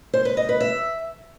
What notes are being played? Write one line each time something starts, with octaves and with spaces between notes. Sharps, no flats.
C5
B4
D#5
B4
E5